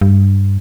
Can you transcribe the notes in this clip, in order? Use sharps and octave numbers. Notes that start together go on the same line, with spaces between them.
G2